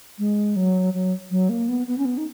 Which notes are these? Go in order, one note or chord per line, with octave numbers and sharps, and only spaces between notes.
G#3
F#3
F#3
F#3
A#3
B3
B3
C#4
B3
D#4